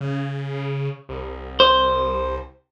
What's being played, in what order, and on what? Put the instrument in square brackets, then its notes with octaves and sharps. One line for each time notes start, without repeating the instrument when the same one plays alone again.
[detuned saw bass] C#3
C2
[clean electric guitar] C5